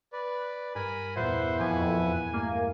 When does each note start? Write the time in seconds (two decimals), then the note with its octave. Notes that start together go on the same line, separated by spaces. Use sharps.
0.13 B4 D5
0.75 G2 A#4 G#5 B5
1.16 E2 A#2 B4 C5 E5 F#5
1.60 F2 G#5
2.33 G2 A3 A#3